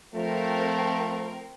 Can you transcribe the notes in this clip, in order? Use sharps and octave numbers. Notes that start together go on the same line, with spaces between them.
F3 A3 C4 A#4